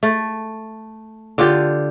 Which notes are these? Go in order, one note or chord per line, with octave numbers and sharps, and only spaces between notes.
A3
D3 F4 G4